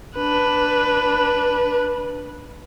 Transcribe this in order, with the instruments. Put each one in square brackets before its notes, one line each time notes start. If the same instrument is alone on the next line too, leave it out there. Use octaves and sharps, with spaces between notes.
[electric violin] D4 B4